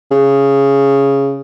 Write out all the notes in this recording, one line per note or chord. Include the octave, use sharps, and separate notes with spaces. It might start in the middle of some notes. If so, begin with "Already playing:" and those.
C#3